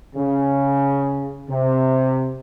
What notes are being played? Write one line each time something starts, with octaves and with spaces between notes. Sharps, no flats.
C#3
C3